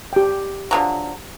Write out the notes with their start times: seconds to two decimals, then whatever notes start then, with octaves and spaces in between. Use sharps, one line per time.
0.13 G4 G5
0.71 D3 F3 F#3